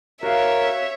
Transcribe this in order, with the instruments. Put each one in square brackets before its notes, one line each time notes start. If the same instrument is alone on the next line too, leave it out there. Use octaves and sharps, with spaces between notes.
[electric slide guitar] F#4 F5 [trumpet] A#4 [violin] C#5 E5